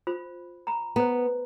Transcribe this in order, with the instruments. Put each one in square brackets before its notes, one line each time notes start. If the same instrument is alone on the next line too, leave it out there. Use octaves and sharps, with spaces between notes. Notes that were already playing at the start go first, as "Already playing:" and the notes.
[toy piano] F4 C5 B5
A#5 B5
[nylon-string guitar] B3 [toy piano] C5 A#5